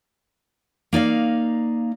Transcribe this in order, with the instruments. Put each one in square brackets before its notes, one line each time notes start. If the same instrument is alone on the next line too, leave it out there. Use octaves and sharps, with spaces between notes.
[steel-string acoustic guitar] A#3 D#4 D5 F5